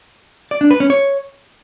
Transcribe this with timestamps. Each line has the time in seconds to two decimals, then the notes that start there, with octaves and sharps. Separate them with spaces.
0.51 D5
0.61 D4
0.71 B4
0.80 C#4
0.90 C#5